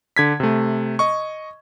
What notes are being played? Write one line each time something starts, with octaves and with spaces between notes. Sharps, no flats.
D3 G#6 B6
C3 A3
D#5 C#6